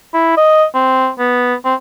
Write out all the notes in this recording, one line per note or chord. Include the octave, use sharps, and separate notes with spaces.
E4
D#5
C4
B3
C4